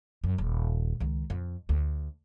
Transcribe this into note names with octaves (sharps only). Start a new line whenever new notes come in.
F#2
D#1
C#2 D#3
F2
D2